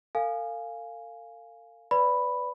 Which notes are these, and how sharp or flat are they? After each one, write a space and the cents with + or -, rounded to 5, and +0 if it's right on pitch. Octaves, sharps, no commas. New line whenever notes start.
A4 +45 F5 -5 G#5 +0
B4 +15 D5 -10 B5 +0